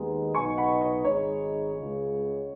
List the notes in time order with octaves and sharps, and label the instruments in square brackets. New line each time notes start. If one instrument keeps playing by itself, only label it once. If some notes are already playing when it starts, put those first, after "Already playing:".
Already playing: [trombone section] D#2 D#3 G#3 B3 D#4
[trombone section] B1 B2 B3 D#4 [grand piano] G#5 C#6
[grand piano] F#5 B5
D#5
[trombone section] G#1 G#2 G#3 D#4 [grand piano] C#5
[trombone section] C#2 C#3 G#3